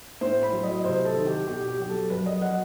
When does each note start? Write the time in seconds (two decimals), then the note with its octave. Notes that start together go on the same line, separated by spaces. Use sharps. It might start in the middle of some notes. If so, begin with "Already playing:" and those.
0.21 A2 C5
0.43 B5
0.53 F#3
0.63 D#5
0.84 C3 C5
1.05 A4
1.16 D#3
1.26 G4
1.47 B2 G4
1.68 G4
1.79 F#3 G4
1.89 A4
2.10 F#2 B4
2.26 D#5
2.41 F#3 F#5